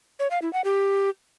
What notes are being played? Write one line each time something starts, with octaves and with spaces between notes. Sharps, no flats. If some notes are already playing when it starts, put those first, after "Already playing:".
C#5
F5
E4
F#5
G4